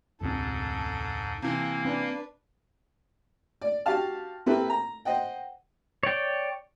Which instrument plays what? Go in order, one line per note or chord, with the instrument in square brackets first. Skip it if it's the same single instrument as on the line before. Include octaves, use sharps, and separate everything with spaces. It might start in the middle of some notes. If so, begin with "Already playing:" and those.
[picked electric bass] E1 C#2 C4 [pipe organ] G#2 [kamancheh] A4 A5
[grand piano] C3 E3 [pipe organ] A#3
[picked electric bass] C4 [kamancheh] D4 B4
[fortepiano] D5
F#4 G4 F5 A5 F6
A#3 C4 E4 G4 A4 B4
A#5
C5 D#5 F#5 G5
[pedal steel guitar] C#5 D5 G5